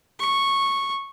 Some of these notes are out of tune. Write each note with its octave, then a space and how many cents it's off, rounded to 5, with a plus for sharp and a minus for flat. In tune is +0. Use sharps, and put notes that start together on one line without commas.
C#6 -10